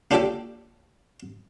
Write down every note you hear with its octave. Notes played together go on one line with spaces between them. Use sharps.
A#3 D4 F4 G4 A4 D5